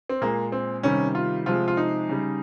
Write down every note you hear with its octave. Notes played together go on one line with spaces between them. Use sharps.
C4
A#2 G#3 A#3
C4
C3 D#3 G3 C#4
F4
C3 F3 G#3 F4
F4
D#4
C#3 G3